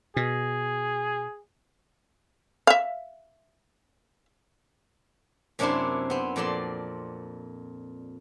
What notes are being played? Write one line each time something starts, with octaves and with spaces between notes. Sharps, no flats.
B2 G#4
E5 F5
F#2 C3 A#3 D4 E4 C5
B3 C4
F2 A#2 D5 A5 C6